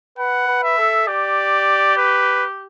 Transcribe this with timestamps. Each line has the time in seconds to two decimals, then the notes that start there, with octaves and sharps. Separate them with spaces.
0.18 B4 F#5
0.48 B4
0.63 E5
0.78 A4
1.08 G4 D5
1.97 B4